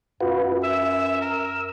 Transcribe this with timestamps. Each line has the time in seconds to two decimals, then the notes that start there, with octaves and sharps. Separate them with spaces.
0.21 F#2 F4 F#4 B4
0.64 E5 E6
1.21 A#4